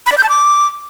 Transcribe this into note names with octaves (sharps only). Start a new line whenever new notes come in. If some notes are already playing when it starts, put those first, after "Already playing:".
B5
D5
G6
A5
D6